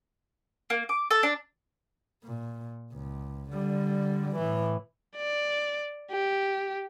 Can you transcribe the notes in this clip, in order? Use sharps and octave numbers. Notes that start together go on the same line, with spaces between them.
A#3
D6
A4
D4
A#2
C#2
D3 G3
A2 E3
D5
G4